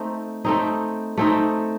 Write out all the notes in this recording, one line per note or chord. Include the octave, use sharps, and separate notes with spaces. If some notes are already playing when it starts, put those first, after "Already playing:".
Already playing: A3 C4 D#4
A3 C4 D#4
A3 C4 D#4